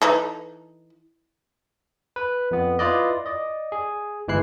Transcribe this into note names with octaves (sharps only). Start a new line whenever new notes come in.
E3 D#4 A4
B4
F2 B3
E4 F4 B4 D5 D#5
D5 D#5
G#4
G1 E3 G#3 E4 F#6 C7